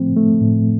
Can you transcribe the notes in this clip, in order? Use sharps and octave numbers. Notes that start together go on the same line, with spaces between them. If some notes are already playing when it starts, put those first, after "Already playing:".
Already playing: A2 F3 A3 C4
A3
A2